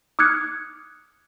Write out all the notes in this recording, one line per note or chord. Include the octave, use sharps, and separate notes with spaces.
D6 D#6 F6 F#6 G#6 C#7